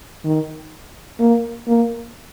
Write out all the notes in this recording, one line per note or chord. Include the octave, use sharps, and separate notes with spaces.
D#3
A#3
A#3